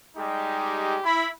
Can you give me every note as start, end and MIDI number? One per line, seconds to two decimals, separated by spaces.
0.17 0.99 55
0.17 0.99 56
0.17 0.99 63
0.17 0.99 67
1.05 1.30 64
1.05 1.30 83